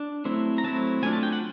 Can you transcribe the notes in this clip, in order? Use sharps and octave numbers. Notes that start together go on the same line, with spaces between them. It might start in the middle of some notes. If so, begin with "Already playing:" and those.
Already playing: D4
F#3 A3 C4 E4
A#5
F#3 A3 C4 E4 A5
F#3 A3 D4 F4 G#5
A5
G5
F#5